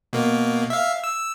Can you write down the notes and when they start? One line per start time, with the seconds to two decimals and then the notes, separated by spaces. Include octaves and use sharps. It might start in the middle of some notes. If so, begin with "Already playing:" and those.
0.13 B2 A#3
0.70 E5 F5
1.04 E6